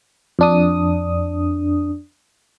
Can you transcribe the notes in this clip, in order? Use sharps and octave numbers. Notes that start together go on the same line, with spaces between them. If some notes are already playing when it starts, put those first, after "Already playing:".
F2 D4 D#6